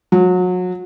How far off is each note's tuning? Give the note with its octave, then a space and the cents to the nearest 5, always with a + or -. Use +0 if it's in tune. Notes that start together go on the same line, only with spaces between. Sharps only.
F#3 -30